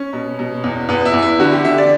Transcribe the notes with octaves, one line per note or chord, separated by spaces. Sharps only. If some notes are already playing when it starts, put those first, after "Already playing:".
Already playing: C#4
B2
B2
E2
E2 B3
E4
E2
E4
D3 F#4
G4
D3 E5
D5